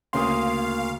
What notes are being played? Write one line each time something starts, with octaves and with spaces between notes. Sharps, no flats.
D2 C#3 A#3 F5 C6 D#6